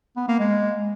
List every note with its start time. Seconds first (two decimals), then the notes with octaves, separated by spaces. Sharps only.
0.17 B3
0.28 A#3
0.40 G#3